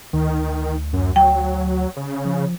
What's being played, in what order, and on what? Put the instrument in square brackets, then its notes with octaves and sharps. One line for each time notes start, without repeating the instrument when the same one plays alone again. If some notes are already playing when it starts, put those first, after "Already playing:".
[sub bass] D2 [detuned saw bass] D#3
[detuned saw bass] F#2
[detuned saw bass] F#3 [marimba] G5
[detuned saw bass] C#3
[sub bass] F3